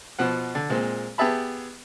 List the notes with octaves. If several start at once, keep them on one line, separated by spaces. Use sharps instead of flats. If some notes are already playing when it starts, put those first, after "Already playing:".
B2 F3 F#5
D3
A#2 G#3 C4
B3 G4 G#4 E5 A5 B5